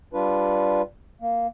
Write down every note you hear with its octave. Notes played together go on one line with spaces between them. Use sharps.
G3 D4 F4 B4
A#3